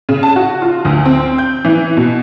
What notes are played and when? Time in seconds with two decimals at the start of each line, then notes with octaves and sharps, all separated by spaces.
0.09 C#3
0.23 A5
0.36 F#4
0.62 F4
0.85 D2
1.05 C4
1.38 G6
1.65 E3
1.97 B2